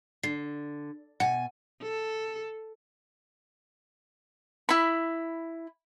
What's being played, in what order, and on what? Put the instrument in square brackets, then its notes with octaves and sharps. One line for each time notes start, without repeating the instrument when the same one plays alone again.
[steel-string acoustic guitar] D3 [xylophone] C7
[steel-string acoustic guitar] B2 G#5 [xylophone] F#5
[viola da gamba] A4
[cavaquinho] E4 B5